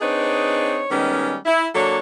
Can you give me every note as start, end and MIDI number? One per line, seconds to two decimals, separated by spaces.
0.01 0.84 60
0.01 0.84 62
0.01 0.84 63
0.01 0.84 68
0.01 0.84 71
0.01 0.84 73
0.91 1.36 51
0.91 1.36 55
0.91 1.36 56
0.91 1.36 59
0.91 1.36 61
1.46 1.68 64
1.75 1.99 54
1.75 1.99 58
1.75 1.99 62
1.75 1.99 69
1.75 1.99 73